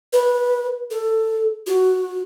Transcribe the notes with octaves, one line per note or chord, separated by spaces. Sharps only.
B4
A4
F#4